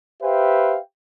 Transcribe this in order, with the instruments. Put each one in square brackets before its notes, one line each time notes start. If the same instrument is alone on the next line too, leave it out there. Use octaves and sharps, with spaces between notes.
[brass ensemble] G4 B4 C5 E5 F5 G5